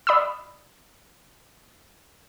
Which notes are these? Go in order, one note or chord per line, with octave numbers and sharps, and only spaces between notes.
D5 B5 D#6 E6